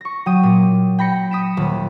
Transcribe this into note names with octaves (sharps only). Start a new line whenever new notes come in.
C#6 A#6
F#3 G5 D#6 D#7
A#2
G5 B5 A#6 C#7
D#6 B6 D7 E7
D#1